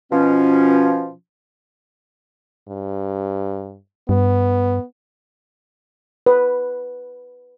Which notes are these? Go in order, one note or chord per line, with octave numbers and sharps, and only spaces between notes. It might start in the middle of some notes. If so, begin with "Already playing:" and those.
B2 F3 C#4
G2
G2 B3
B4